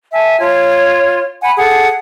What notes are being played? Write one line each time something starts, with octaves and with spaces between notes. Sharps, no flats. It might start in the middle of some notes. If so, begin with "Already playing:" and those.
E5 G#5 A5
F4 C#5 G#6
F#5 G#5 B5
G#4 A4 F#5